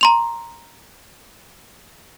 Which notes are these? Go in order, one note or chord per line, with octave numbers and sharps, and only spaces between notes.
A#5 C6 F7